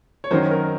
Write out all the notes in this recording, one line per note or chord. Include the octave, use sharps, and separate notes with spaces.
C#5
F#2 D#3 F#3 C#4 C5
A#4